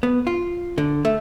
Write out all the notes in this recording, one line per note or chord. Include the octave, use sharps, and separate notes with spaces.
B3
F4
D3
A3